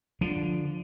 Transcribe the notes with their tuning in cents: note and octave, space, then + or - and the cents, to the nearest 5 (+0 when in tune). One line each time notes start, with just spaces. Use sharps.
D3 +0 F3 +0